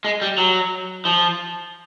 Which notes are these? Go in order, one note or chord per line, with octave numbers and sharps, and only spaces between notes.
G#3
G3
F#3
F3